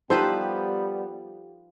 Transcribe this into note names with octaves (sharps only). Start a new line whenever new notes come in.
F3 G3 B3 D#4 G4 A4 B4 C5